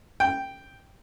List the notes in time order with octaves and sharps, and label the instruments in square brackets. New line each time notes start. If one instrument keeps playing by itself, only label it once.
[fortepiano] G5